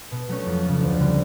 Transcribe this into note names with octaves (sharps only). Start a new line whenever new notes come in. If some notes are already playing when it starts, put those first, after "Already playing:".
B2
F#3 A3 C#4
F2
C#3 F3
D2
D3 G3 C4